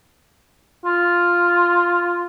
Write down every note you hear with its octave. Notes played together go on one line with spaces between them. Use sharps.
F4